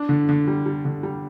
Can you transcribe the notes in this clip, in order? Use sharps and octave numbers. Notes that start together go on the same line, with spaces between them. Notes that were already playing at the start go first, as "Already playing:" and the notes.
Already playing: D4
D3
D3
G3
G3
D3
G3